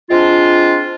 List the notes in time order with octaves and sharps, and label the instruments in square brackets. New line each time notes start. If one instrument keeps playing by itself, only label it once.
[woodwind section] G#3 C4 D4 F4